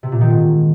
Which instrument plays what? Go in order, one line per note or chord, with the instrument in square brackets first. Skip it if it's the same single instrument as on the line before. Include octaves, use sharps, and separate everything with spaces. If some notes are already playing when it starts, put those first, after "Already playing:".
[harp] C3
A#2
D#3
G#2